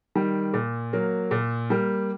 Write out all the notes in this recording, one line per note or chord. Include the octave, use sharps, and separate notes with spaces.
D#3 G3
A#2
F#3 A#3
A#2
G3 A#3